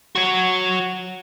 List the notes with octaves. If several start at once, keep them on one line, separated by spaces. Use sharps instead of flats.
F#4 C#5